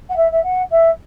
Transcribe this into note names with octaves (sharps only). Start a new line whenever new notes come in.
F#5
E5
E5
F#5
E5